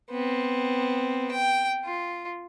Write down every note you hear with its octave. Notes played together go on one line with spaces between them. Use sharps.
B3 C4
G5
F4